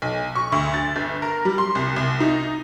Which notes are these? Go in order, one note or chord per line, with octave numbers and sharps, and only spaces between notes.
B1
C#6
D2
A6
G1
A#4
G3
C6
C2
C2
D#4